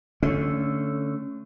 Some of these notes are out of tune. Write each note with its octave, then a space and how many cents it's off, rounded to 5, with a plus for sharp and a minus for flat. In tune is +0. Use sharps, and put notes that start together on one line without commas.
D3 -10 A3 +0 C#4 +0